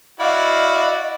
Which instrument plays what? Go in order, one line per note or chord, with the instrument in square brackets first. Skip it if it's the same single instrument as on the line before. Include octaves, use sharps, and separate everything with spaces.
[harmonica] E4 F#4 D5 [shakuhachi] D#5 [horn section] F5